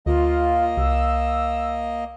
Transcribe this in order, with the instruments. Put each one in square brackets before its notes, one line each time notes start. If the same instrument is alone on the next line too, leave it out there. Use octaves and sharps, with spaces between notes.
[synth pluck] D2 [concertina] A#3 D#5 [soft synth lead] F4
[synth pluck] C2 [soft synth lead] E6